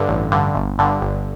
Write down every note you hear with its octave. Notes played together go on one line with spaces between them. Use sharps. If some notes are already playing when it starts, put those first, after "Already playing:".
Already playing: G2 D3
A1
G2 D3
G1
G2 D3
G1